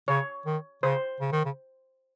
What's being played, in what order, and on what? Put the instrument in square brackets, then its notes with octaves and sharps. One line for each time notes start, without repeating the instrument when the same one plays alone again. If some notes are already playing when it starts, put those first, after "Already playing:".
[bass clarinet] C#3 [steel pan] C#5
[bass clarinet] D#3
[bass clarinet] C#3 [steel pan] C5
[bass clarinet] C#3
D#3
C#3